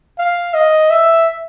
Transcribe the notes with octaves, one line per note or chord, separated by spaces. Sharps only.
F5
D#5
E5